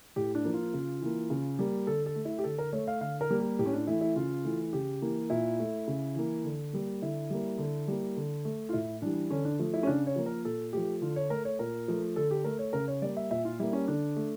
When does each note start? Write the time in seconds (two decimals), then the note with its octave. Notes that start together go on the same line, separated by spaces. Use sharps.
0.16 A2 G4
0.35 D4
0.44 F3 A#3
0.54 F4
0.73 C#3
1.02 E3 A#3
1.30 C#3
1.59 G3 A#3
1.87 D3 A4
2.06 A4
2.16 A3
2.25 E4
2.39 G4
2.44 D3 A4
2.58 A#4
2.73 A3 C#5
2.87 F5
3.01 D3 F5
3.21 A#4
3.30 G3 A#3
3.40 G4
3.59 A2 G4
3.66 C#4
3.73 D4
3.87 E3 A3 E4
4.01 E4
4.16 C#3 F4
4.45 E3 A3
4.73 C#3 G4
5.02 E3 A#3
5.30 A#2 E4
5.59 A3
5.88 C#3
6.16 E3 A#3
6.44 D3
6.73 G3 A#3
7.02 D3 E4
7.30 G3 A#3
7.58 D3
7.88 G3 A#3
8.17 D3
8.45 A3
8.69 F4
8.73 A2 E4
9.02 E3 G3 D4
9.30 D3 C#4
9.45 D4
9.59 F3 A3
9.74 E4
9.83 C#4
9.87 C#3 D4
10.07 C#5
10.16 F3 A#3
10.26 A#4
10.45 A#2 A4
10.73 F3 A3 G4
11.01 D3 F4
11.16 C#5
11.30 A3 A#4
11.45 C#5
11.59 A#2 A#4
11.88 F3 A3
12.16 D3 A4
12.31 G4
12.44 A3 A#4
12.59 C#5
12.73 C#3 A#4
12.88 C#5
13.02 G3 A#3 D5
13.17 E5
13.31 A#2 E5
13.45 F4
13.59 G3 A#3 E4
13.73 C#4
13.88 D3 D4
14.16 A3